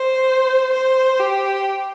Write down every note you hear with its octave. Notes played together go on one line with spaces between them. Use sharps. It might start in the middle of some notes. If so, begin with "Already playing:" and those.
Already playing: C5
C5
G4